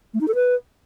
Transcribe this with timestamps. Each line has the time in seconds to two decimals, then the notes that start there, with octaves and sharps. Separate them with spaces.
0.14 A3
0.21 D#4
0.28 A4
0.35 B4